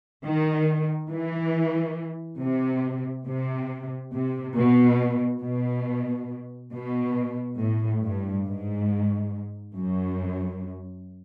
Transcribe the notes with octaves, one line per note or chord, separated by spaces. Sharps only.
D#3
E3
C3
C3
C3
B2
B2
B2
A2
G2
G#2
F#2